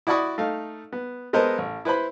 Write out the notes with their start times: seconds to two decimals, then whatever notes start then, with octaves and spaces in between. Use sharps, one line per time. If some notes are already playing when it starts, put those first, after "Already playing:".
0.07 E4 F#4 D5 B5 C#6 D#6
0.38 A3 D#4 F5
0.92 B3
1.33 G#3 B3 A4 A#4 C5 D#5
1.58 A1
1.85 E4 B4 C5 B5